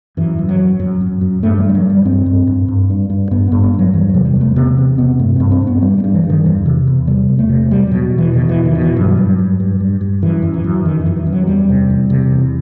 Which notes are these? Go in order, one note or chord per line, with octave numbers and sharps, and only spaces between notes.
F#2 E3
F#2
F#3
F#2
F#2 F#3
F#2
F#2
G2 A3
F#3
G2
G3
F#3
G2 G3
G2 C4
G2
G2
G2
G2
G2
G2 B3
G2 B3
B3
G2
F#3
E2 E3
F#3
C3
G3
E2
A3
C3 B3
E2 C4
C3 B3
G2 A3
G2 C4
C4
G2 B3
G2 G3
G3
G2
E3
G2
D#3
E2 E3
C3
E2
C3 G3
E2
A3
C3
E2 G3
B2 F#3
E2
E3
B2 D#3
E3
E2
D#3
B2
E3
G2 F#3
G2
G2
G2
G2
G2
F#2 E3
F#2
E3
F#2
F#2 D#3
E3
F#2
E3
F#2
F#3
E2 G3
C3
E2
C3
E2